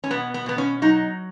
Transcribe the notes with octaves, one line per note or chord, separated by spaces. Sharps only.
C#4
B2 B3
B3
B2 B3
C#4
F#3 D#4